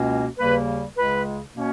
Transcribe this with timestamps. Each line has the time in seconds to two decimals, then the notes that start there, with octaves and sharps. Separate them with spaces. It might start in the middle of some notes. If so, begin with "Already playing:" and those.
Already playing: C#2 B2 A#3 C#4
0.38 D#2 C#3 G3 A#3 B4
0.96 C#2 C#3 G#3 B4
1.54 B2 A#3 C#4